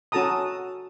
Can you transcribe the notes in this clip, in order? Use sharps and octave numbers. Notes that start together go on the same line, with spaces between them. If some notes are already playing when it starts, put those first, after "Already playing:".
C#4 F#4 A4 A5 A#5 D#6